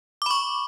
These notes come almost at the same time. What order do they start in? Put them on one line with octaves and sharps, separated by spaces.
D6 B5 C#6